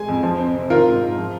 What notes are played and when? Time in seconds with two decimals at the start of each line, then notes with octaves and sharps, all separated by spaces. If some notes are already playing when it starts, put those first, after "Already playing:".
Already playing: G#3 G#5
0.08 F2
0.23 F3
0.38 C4
0.55 C3
0.70 D#3 F4 A#4
0.86 G#2
1.01 G#2
1.17 F3